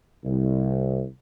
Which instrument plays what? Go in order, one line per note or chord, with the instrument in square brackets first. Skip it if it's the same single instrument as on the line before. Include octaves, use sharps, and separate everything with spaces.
[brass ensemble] C2